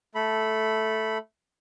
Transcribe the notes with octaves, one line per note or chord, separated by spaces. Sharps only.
A3 A4 B5